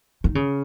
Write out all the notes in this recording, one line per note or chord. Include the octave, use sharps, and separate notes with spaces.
D#3
C#3